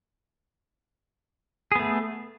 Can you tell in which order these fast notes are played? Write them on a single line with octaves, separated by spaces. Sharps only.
G#4 B3 A3